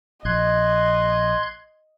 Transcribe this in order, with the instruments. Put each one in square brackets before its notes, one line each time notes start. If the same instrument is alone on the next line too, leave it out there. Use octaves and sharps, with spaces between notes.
[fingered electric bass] A#1 [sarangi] D#5 [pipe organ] C6 F#6 G#6